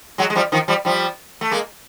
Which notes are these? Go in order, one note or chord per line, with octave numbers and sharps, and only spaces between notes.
F#3 G#3
G#3
F3 G3
D#3 F3
F3 G3
F3 G3
A3
G#3 A#3